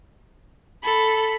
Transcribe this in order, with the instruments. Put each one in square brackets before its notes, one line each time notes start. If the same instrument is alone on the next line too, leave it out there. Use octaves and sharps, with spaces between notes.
[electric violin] A4 [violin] B5